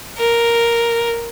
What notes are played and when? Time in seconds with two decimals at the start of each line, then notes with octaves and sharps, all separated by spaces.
0.18 A#4